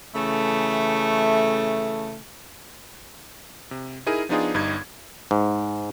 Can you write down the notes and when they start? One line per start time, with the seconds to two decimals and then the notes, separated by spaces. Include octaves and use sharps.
0.15 C#3 E3 A3
3.71 C3
4.06 D#4 E4 G#4 A#4 D#7
4.29 F3 B3 D4 D#4 F4 G#4
4.54 G1 G2 D#4 G#6
5.31 G#2